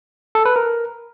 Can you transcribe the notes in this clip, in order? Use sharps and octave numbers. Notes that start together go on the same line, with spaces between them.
A4
B4
A#4